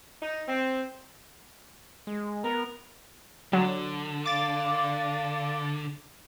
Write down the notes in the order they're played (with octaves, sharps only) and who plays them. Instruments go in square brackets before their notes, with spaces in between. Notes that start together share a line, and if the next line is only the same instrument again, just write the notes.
[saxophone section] D#4
C4
[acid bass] G#3
[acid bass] B3 [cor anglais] A#4
[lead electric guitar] D3 [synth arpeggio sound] F#3
[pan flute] F5 [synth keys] D6 A6